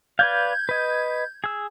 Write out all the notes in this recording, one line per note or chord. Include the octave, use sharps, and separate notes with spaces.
B4 D5 F5 G6 G#6
B4 D#5
G#4 E6